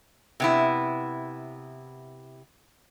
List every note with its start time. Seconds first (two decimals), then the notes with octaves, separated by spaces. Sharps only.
0.40 C3 B3 E4